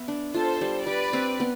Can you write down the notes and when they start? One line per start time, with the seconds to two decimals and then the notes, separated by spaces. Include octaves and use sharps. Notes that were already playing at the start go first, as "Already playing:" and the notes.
Already playing: B3 E5
0.08 D4
0.34 F4 A4 C5
0.61 G3
0.87 G3 B4 D5
1.13 C4
1.40 B3